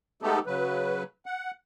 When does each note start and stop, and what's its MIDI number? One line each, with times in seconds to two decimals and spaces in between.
0.22 0.39 56
0.22 0.39 57
0.22 0.39 59
0.22 0.39 63
0.22 0.39 67
0.22 0.39 69
0.46 1.03 49
0.46 1.03 54
0.46 1.03 71
1.26 1.51 78